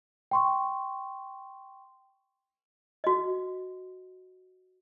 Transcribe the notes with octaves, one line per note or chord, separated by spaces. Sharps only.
G5 C6 C#6
F#4 D#5